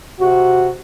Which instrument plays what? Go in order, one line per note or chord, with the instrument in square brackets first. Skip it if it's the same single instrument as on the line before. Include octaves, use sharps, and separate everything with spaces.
[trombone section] C3 F#4